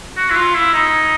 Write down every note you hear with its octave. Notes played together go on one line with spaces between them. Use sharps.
F#4
E4
F4
E4
D#4